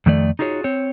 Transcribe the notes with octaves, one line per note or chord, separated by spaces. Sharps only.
F2 D#3 A3 D5
D#4 F4 F#4 G#4 C#5
C4 C#5